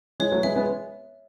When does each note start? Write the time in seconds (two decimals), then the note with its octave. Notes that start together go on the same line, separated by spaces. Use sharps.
0.20 E3 G#3 C#5
0.32 F#3 A3
0.43 G#3 B3 E5
0.56 G#3 B3